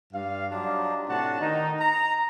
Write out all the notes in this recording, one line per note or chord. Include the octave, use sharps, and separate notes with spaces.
G2 F5
F#3 G3 D4 D#4 F4 G4
A2 C3 D4 F#4 F#5 A5
D#3 D#4
A#5